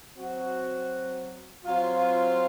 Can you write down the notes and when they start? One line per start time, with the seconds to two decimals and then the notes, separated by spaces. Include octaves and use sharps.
0.14 F#3 C4 F#4
1.64 F#3 C4 F4